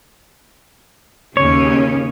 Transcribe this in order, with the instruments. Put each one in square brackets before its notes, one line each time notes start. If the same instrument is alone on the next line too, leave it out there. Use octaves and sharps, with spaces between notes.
[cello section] D#2 C#3 C#4 [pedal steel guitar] C#5